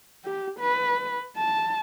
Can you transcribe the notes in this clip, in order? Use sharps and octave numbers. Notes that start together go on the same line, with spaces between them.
G4
B4
A5